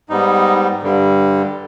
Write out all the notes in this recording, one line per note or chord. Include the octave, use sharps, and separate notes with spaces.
G#2 G3 B3 D#4
G2 D3 G3